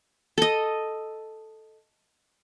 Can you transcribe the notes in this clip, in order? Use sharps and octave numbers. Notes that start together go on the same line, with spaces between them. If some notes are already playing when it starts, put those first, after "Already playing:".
A4 D#5